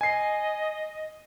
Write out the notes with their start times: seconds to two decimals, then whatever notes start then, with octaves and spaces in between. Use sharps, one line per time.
0.01 D#5 G#5 C7